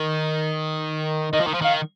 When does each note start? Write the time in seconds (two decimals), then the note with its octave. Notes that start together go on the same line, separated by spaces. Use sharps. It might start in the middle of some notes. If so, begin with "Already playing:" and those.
Already playing: D#3
1.32 D#3 D#5
1.40 F3
1.47 D#3
1.54 F3
1.61 D#3 F5